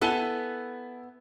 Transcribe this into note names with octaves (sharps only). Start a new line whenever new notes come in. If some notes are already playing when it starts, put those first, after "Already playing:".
B3 E4 A4 G#5 A5 G7